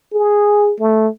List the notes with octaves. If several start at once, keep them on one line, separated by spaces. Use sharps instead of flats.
G#4
A3